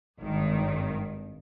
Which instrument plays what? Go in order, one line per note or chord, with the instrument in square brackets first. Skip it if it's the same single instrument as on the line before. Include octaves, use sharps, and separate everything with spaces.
[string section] G#1 G2 D#3